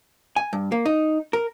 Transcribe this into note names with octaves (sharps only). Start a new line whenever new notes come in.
G#5
G2
A#3
D#4
A#4